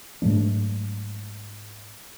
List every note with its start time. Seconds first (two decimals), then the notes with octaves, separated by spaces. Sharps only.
0.22 G#2 F#3 A3 D4